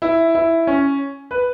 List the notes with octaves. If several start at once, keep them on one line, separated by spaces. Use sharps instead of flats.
E4
E4
C#4
B4